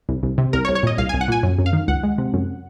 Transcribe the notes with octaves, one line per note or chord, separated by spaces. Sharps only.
C2
C2
C3
C2 A#4
C#5
C2
C#5
A#2 D#5
C2 F5
C2 G#5
F#5
A#2 G#5
F#2
F#2
F5
D#3
C#2 F#5
G#3
C3
F#2